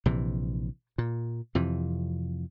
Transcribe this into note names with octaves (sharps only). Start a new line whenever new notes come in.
A#1 C3 E3
A#2
F2 C3 E3